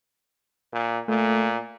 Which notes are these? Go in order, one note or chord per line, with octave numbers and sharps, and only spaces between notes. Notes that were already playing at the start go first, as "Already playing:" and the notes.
A#2
A#2 A3